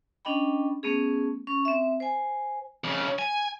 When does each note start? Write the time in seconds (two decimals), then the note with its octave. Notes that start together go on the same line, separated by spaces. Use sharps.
0.25 C#4 D4 D#5 G5 B5
0.83 A3 B3 C#4 G#4
1.47 C#4 C#6
1.65 C4 E5
2.00 C5 G#5
2.84 F2 C#3
3.19 G#5